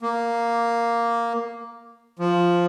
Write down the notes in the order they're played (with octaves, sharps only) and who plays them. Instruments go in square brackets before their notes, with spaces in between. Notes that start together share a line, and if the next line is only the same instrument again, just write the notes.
[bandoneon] A#3
F3